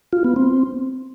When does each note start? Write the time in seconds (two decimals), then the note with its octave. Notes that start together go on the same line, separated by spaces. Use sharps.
0.13 F4
0.24 B3
0.36 C4